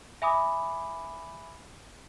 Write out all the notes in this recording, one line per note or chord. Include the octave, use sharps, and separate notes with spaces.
E5 G#5 B5 D6 D#6